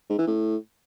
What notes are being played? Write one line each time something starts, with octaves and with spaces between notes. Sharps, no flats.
G#2
E3
A2